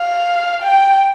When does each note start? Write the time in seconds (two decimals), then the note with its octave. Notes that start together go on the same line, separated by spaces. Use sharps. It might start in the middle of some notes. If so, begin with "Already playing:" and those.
Already playing: F5
0.63 G5